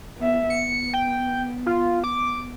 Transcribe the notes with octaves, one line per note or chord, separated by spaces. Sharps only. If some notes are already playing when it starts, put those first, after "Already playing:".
B3 E5
B3 C#7
G5
F4
D6